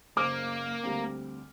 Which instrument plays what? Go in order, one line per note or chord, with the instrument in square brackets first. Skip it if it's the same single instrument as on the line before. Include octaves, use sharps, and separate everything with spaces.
[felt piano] F#1 C5 F6 [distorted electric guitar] A#3 [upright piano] D6
[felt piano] D2 G3 C4